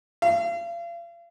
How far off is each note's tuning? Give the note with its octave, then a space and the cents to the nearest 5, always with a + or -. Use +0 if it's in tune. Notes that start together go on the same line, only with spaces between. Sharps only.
F5 -35